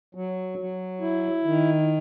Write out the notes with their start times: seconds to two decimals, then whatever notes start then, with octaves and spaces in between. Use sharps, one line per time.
0.15 F#3
0.58 F#3
1.01 E4
1.44 D#3